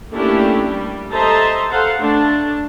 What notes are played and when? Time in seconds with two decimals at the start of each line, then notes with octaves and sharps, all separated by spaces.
0.12 A3 A#3 C#4 D4 E4 G4
0.69 G3
1.12 A4 C5 D#5 E5 A5 A#5
1.70 A4 C5 F5 F#5
2.00 A3 D4 A5